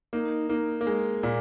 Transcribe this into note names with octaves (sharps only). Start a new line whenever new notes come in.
A#3 D#4
A#3 D#4
A#3
G#3
A#2